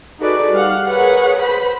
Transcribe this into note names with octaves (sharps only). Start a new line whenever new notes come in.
D#4 F#4 G#4 A4 B4 D5
G3 F5 F#5
G#4 A#4 B4 C#5 F#5
B4 C5 B5